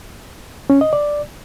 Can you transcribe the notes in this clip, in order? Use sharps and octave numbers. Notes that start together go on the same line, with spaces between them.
C#4
D#5
D5